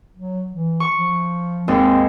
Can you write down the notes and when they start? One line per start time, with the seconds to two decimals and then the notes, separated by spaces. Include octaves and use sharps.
0.17 F#3
0.52 E3
0.80 C#6
0.96 F3
1.68 D#2 G#2 C4